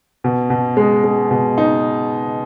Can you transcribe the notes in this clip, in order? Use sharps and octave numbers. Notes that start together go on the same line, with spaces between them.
B2
B2
G#3
G#3
B2
D#4